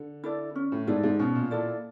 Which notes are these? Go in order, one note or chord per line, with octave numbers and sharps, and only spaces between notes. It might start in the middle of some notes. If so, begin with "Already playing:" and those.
Already playing: D3
E4 A4 D5
C#4
A2
G#2 E4 A4 D5
G#2
B2 C#4
A#2
A#2 E4 A4 D5